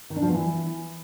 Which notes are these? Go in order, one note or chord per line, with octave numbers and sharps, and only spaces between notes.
D#3
D4
F3
B3
E3